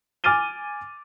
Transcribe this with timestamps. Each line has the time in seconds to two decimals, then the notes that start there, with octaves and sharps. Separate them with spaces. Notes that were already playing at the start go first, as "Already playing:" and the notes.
0.24 G#5 D6 F6 A6 D#7 G7